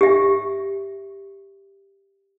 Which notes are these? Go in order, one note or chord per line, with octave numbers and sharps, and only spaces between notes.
G4 E5